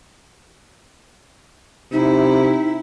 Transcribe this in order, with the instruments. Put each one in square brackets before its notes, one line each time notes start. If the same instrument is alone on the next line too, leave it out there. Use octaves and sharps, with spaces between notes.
[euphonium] C3 [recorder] D#4 [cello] E4